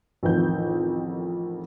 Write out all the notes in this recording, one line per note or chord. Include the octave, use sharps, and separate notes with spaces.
A1 F2 D#3 G6